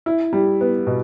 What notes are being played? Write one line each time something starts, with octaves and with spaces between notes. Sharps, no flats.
E4
G3
B3
B2